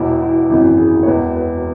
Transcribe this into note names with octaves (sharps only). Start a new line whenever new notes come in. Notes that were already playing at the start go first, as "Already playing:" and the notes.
Already playing: E1 E2 B2 E4
E4
G#1 F#2 E3
G#4
C#5
E1 E2 B2 B4
B4